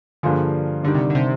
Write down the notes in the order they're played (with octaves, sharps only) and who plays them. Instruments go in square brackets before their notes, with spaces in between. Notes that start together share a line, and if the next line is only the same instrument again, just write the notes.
[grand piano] G2 F3 A#3 F4 G#4 [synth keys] D3
[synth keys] D3 [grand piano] D#3 G3 D4
[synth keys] C3
D3
C3